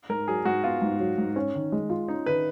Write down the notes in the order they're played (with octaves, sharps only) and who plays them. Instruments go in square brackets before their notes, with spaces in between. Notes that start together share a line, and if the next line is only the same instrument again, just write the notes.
[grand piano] G#2 [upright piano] A#4
[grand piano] F#3 [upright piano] G#4
[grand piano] G#2 [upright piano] F#4
[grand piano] B3 [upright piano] F4
[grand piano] G#2
F#3
G#2
C#4
D#3
G#3
F4
[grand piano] C#4 [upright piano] D#4
[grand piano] D#3 [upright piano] B4